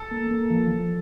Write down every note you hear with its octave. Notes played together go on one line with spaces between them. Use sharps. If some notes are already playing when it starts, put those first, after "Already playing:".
Already playing: A4
A#3
A#3
F3
F3